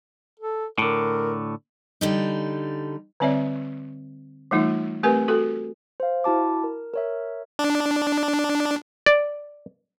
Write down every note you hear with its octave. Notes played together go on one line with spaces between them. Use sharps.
A4
A2 D3 A#4
D3 G3 D#4
D3 G3 C4 C#5 D5 E5
E3 G3 A3 D#4 F4
A3 C4 G4 A#4 B4 G#5
F#4 A4
C5 F5
E4 F#4 A5 D6
A#4
A#4 C#5 E5
D4
D5